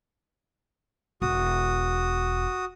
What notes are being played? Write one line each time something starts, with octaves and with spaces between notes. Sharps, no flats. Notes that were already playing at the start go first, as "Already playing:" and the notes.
E1 F#4 D#6